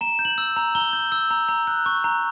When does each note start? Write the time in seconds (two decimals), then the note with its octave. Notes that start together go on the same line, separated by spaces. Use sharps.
0.01 A#5 E7
0.19 G6
0.25 F#7
0.38 E6
0.56 A#5
0.75 A#5 G7
0.93 G6
1.12 E6
1.30 A#5
1.48 A#5
1.67 F#6
1.86 C#6
2.04 A#5